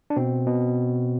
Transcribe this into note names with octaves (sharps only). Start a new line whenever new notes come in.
D4
B2 C4
B2